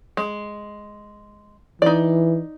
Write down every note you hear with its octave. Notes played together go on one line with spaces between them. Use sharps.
G#3
E3 D#4 D5